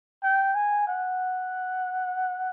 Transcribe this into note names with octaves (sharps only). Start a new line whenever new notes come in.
G5
G#5
F#5